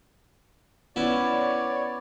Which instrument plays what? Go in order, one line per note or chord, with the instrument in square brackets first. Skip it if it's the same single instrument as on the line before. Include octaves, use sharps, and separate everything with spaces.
[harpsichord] B3 C#4 E4 [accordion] C#5 D5